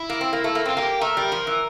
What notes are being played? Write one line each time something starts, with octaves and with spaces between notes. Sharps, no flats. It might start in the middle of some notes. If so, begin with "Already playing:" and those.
Already playing: E4
A#3
C4
A#3
A3
A#3
C4 F4
A#3 G4
A3 A#4
G3
F3
E3